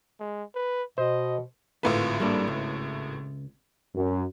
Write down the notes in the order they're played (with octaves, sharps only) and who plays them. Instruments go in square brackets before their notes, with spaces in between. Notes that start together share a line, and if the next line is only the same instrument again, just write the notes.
[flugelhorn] G#3
B4
[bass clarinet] B2 [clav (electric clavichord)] C5 [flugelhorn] D#5
[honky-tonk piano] G#1 A2 B4 [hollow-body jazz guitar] D2 F4
[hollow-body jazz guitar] G3 A#3 D4
C#2
[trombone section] F#2